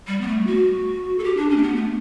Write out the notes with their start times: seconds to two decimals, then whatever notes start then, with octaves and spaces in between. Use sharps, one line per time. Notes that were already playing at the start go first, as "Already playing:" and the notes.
0.07 G3
0.21 B3
0.27 A3
0.47 F#4
1.18 A4
1.23 G4
1.37 D4
1.50 C#4
1.56 A3
1.62 B3
1.76 A3